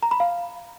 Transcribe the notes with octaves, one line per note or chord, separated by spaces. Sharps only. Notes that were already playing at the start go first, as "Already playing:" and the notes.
A#5
B5
F5